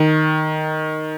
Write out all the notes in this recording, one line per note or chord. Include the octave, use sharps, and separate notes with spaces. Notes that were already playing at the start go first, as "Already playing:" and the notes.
Already playing: D#3